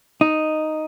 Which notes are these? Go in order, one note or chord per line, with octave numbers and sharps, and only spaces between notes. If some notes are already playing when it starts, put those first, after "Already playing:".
D#4